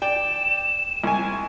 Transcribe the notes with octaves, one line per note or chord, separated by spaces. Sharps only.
D5 G5 E7
C2 G#5